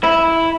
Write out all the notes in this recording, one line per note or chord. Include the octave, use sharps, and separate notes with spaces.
E4